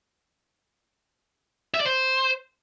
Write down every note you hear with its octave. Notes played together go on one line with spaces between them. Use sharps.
E5
D5
C5